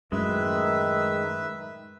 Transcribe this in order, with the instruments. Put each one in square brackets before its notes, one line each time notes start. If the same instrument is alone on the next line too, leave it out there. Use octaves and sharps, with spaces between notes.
[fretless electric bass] F#2 A2 [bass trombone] D#3 [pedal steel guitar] G#3 [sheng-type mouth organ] B4 E5 E6